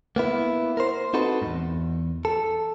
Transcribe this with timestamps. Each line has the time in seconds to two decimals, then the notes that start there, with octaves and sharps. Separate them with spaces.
0.16 A#3 B3 E4
0.77 A#4 C5
1.14 C4 D#4 F#4 A4 B4
1.42 E2 G#2
2.25 A4